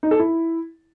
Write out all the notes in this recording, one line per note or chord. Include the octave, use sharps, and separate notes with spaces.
D#4
A4
E4